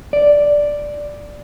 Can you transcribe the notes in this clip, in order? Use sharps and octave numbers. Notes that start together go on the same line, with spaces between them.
D5